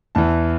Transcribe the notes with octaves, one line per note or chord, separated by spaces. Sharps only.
E2 E3 A5